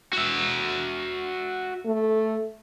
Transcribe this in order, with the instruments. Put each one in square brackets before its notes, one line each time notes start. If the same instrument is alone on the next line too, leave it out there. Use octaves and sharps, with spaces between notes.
[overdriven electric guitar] F#4 E5
[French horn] A3